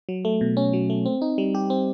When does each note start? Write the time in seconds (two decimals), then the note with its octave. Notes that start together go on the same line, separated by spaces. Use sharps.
0.09 F#3
0.25 A3
0.41 B2
0.57 C#4
0.73 F#3
0.90 A3
1.06 C4
1.22 D#4
1.38 G3
1.55 G4
1.70 C4